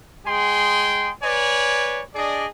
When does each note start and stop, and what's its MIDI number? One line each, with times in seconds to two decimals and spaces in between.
0.26 1.10 56
0.26 1.10 68
0.26 1.10 79
0.26 1.10 84
1.23 2.02 71
1.23 2.02 73
1.23 2.02 74
1.23 2.02 80
2.15 2.46 62
2.15 2.46 68
2.15 2.46 74
2.15 2.46 75